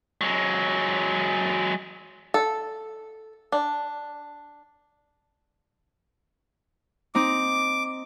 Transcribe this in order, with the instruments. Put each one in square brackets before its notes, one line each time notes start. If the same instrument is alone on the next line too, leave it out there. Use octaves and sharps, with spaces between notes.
[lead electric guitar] F#3 G#3
[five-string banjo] A4
D4
[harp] C4 D#4 [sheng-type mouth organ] D6